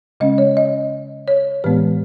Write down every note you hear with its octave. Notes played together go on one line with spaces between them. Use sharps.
C#3 G#3 C#4 D#5
C#5
D#5
C#5
A2 E3 G#3 B3 B4